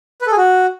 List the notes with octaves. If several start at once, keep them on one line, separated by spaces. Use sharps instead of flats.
B4
A4
G#4
F#4